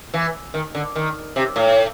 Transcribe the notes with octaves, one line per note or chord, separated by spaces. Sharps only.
E3
D#3
D3
D#3
C3
A2